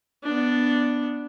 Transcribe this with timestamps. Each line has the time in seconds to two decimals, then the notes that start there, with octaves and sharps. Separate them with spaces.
0.24 B3 D4